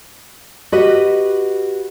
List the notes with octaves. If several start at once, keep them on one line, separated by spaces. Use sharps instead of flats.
F#4 G4 B4 D#5